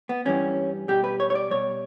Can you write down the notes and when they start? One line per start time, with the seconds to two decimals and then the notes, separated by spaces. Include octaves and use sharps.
0.09 B3
0.25 G2 E3 G3 C#4
0.88 B2 G3 G4
1.04 B4
1.20 C#5
1.30 C#5
1.35 D5
1.51 B2 G3 C#5